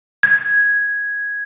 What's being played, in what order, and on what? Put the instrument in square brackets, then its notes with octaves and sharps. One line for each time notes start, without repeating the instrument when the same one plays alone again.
[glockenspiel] G#6